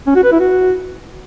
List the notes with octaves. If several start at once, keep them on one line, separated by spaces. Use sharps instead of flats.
C#4
F#4
B4
E4
F#4